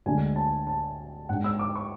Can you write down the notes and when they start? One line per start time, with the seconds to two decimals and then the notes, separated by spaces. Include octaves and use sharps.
0.06 D2 D3 G#3 D4 G#5
0.36 A5
0.67 A5
1.29 G#2 G#3 D4 F#5
1.44 E6
1.59 D6
1.75 C#6